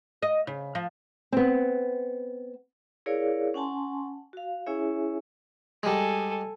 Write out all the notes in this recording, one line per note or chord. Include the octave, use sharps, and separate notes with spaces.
D#5
C#3
F3
B3 C4
E4 G#4 A#4 C#5 D5 F5
C#4 F#5 G#5 A5 C6
F#4 F5
C#4 E4 G#4 C#5 E5 G#5
G3 G#3 A4 G#5